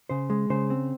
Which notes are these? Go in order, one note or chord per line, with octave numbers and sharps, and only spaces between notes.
C#3 C5
G#3
C#3 C5
C4